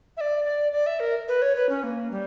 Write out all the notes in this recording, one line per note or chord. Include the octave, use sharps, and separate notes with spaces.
E5
D5
D5
D5
E5
A#4
B4
C#5
B4
C#4
A#3
G3